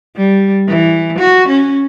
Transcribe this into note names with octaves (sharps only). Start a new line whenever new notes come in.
G3
E3
F#4
C#4